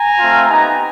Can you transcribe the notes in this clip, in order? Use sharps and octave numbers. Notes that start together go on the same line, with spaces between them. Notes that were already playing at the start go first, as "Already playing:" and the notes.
Already playing: G#5 A#5
A3 C4 F4
B3 D#4 G4 G#5 A#5